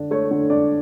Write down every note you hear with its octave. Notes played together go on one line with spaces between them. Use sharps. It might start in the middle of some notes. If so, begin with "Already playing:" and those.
Already playing: D3 D4
A3 C#5
D3
D4 D5